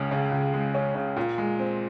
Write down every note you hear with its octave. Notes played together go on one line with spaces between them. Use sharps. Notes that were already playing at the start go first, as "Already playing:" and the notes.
Already playing: C#2 C#3 G#3 C#4
C#3
C#2
G#3
C#4
C#3
A#2
G#3
C4